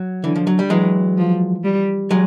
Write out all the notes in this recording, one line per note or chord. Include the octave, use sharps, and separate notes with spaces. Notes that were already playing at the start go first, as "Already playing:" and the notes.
Already playing: F#3
D3 E3
F3
F#3
G3
E3 F#3 G#3
F3
G3
F#3 G#3